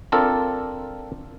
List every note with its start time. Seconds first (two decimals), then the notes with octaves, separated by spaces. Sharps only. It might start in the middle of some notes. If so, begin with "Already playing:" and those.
0.12 C4 D4 F4 A4 A#4